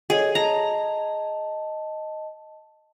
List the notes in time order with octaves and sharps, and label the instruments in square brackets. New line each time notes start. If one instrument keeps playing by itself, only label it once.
[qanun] G#4 [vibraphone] A4 C#5 D#5
[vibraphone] D#5 A5 [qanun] A#5